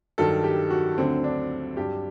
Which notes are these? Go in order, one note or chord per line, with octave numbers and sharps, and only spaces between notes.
G2 D#3 F#3 A4
G4
F#4
D2 D3 F#3 C4
D4
G2 F#3 G4